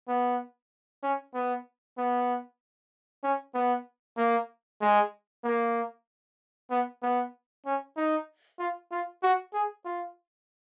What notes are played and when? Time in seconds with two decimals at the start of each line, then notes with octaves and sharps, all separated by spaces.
0.08 B3
1.03 C#4
1.34 B3
1.98 B3
3.23 C#4
3.54 B3
4.17 A#3
4.81 G#3
5.44 A#3
6.70 B3
7.02 B3
7.65 C#4
7.97 D#4
8.59 F4
8.91 F4
9.23 F#4
9.53 G#4
9.85 F4